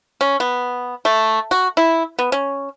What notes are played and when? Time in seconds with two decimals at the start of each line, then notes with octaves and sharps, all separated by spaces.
0.21 C#4
0.40 B3
1.05 A3
1.51 F#4
1.77 E4
2.19 B3
2.32 C#4